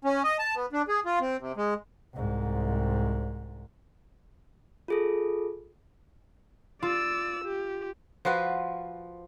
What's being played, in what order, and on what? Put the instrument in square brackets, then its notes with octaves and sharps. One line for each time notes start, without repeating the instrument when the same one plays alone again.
[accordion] C#4
D#5
A5
B3
D4
G#4
F4
C4
C3
G#3
[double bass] C2 G#2
[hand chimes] F4 G#4 A4
[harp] F4 [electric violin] D5 E6
[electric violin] G4
[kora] F3 F4 F#4 B4